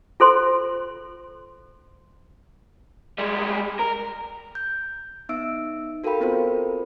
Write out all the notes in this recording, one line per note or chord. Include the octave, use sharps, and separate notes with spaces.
F4 A4 C5 C6
G3 G#3
A#4
G6
B3 D#4 E5 E6 D7
F#4 A4 A#4 F5 G5 B5
B3 C4 F4 A4 A#4 C5